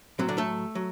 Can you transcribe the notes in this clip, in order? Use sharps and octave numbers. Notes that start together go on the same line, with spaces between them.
A2 F#3 C4
D3 D4
A3 A4
F#3